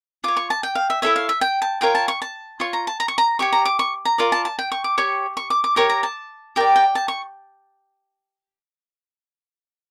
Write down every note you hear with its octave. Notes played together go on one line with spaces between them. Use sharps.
F4 C#5 D6
C#6
A5
G5
F5
E5
E4 A4 C#5 E5
F5
E5
G5
A5
F4 A#4 C#5 G5
A5
C#6
A5
F4 C#5 C#6
A#5
A5
A#5
C#6
A#5
G4 C#5 C#6
A#5
D6
C#6
A#5
F4 A#4 D5
A5
A5
G5
C#6
D6
G4 C#5 C#6
C#6
D6
D6
G4 A#4 C#5 C#6
A#5
A5
G4 A#4 D5 G5
G5
A5
C#6